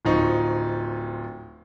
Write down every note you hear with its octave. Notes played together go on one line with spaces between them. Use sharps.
D1 F3 D#4 C5 C#6